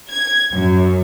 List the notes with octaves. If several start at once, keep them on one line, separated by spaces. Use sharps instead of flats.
G#6
F#2